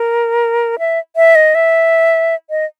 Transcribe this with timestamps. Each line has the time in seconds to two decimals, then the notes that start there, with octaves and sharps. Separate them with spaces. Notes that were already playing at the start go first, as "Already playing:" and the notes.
Already playing: A#4
0.79 E5
1.16 E5
1.35 D#5
1.55 E5
2.50 D#5